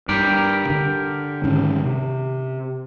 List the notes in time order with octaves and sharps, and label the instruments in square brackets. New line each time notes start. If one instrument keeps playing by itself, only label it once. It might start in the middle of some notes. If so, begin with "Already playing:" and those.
[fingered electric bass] G2 [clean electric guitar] G4 A#4 D5
[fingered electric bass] D3
G#2 D#3 C#4
C3